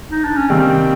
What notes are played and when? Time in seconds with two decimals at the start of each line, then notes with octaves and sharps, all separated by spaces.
0.11 D#4
0.24 D4
0.37 C#4
0.50 C3 D#3 G3 A#3 C4